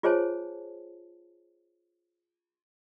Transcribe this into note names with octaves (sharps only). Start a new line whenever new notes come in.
F4 G#4 C5 C#5 G#5 A5